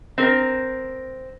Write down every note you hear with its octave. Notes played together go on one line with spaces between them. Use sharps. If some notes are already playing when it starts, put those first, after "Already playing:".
C4 A#4